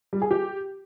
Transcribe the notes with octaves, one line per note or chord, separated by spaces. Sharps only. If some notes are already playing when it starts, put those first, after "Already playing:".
G3
G#4
G4